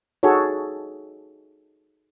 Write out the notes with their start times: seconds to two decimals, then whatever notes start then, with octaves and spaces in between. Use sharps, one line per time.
0.23 D#4 F#4 G#4 A4 C#5